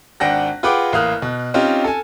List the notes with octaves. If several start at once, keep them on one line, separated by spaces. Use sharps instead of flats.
G#1 D4 F#5 G5 F#6 A#6
F4 G#4 B4 F#5 G5 D6
A1 A#3 F5 D#6 F6 F#6
B2
C4 C#4 D#4 F4 G4
A4 G#5